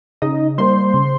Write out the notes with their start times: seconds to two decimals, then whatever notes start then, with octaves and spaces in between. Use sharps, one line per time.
0.22 C#3 D#4 D#5
0.58 G3 A#3 C5 C6
0.94 C#3